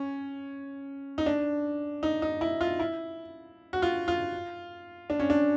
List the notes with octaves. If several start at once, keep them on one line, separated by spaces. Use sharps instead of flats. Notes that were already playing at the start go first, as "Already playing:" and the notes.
Already playing: C#4
D#4
D4
D#4
D#4
E4
F4
E4
F#4
F4
F4
D4
C#4
D4